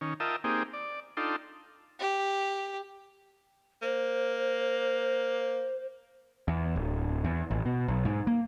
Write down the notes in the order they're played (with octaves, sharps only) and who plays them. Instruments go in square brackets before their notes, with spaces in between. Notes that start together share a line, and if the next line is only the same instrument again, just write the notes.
[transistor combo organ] D#3 C#4
F4 A#4 D#5 E5 G5 A5
A#3 C4 D#4 G4 G#4
D5
D4 D#4 F4 A4 G5 C6
[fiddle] G4
[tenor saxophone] A#3 [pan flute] C5
[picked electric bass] E2
D1
E2
A1
B2
B1
G#2
A#3